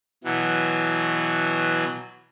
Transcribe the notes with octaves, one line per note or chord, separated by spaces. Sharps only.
B2 E3 F#3